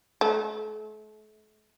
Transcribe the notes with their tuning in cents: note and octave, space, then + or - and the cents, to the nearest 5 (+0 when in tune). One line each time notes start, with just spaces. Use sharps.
A3 -40